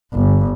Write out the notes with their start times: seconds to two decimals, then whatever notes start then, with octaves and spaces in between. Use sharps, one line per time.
0.14 G1